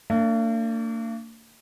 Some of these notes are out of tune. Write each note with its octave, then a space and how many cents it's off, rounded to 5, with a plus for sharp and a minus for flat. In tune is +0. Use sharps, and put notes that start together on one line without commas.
A#3 -45 D4 +0